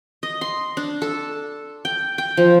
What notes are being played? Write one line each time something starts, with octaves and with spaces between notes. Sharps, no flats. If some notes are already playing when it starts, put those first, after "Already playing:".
D#5
C6
D4
A4
G5
G5
F3